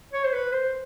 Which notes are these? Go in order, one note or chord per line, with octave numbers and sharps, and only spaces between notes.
C#5
C5
B4
C5